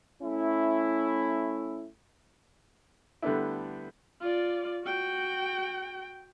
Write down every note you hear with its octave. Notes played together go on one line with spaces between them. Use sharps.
A3 C#4 E4
D3 G3 A3 B3 D4 E4
F4 D5
F#4 G5